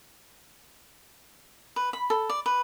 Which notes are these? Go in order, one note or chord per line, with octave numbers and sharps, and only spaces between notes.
B4
B5
A4
D5
B4